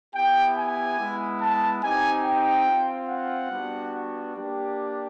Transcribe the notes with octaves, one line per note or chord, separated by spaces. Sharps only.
B3 E4 G4 G5
G#5
G#3 B3 E4
A5
C4 D#4 G4 G#5
G5
C4 F4
F#5
G3 B3 D4 F#4
A#3 D4 G4